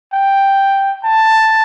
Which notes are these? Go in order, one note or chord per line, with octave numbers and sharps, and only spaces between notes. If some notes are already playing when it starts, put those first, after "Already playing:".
G5
A5